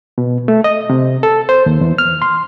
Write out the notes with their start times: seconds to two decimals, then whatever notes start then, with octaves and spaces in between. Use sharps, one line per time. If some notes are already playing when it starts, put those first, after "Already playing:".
0.18 B2
0.48 A3
0.64 D#5
0.90 C3
1.23 A4
1.49 C5
1.66 D#2
1.81 E2
1.98 F6
2.22 C6